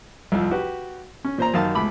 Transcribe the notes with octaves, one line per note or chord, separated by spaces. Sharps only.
C2 F2 F3
F#4 G4 B4
C#4
A#2 C5 A#5
F#2 D#3 F5 A5
C#2 A3 B5 D6